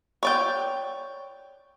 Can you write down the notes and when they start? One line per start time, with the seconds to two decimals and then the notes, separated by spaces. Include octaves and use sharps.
0.23 C#5 D5 G5